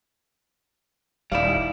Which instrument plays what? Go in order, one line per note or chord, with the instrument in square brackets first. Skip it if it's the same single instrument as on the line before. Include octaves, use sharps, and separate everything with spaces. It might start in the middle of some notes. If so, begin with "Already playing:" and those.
[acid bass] D#1 [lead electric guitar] G3 E4 [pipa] D#4 D5 F5